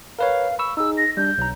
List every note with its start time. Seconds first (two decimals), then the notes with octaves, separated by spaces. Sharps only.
0.19 A#4 B4 C#5 F5
0.59 B5 C#6 E6
0.77 D#4 G#4 E6
0.97 A#6
1.17 G3 D4 G6
1.38 B1 A#5